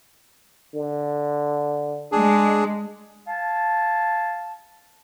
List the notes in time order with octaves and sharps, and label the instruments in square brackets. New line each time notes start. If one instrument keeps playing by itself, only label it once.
[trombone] D3
[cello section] G#3 [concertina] D4 G#4
[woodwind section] F5 G#5 A5